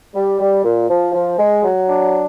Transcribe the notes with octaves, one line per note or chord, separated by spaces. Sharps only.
G3
G3
A#2
F3
F3
G#3
F#3
D4